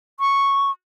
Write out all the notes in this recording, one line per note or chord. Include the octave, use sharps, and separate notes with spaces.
C#6